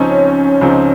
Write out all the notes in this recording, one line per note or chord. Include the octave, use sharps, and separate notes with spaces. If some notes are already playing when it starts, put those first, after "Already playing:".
Already playing: C#2 C#3 F3 C4 C#4 D#4
C#2 C#3 F3 C4 D#4